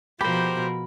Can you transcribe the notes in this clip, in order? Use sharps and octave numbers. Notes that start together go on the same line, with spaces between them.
B2 F3 G4 A#4 C5 B5